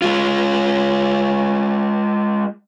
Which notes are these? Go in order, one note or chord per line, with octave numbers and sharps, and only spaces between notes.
G#3 F4